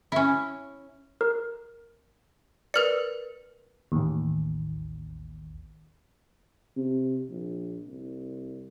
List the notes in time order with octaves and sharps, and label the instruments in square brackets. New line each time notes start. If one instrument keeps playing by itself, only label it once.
[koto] C#4 E4
[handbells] A#4
[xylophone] A#4 B4 C#7 [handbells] D5 F6
[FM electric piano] A1 D#2
[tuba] C3
A#1
C2